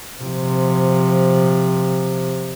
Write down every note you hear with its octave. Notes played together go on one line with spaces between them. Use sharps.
C3 F3